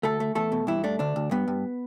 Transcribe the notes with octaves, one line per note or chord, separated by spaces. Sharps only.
D2 A3 A4
A3
E2 A3 A4
B2
G2 E3 E4
A3 D4
D2 D4
D2
G2 B3
G2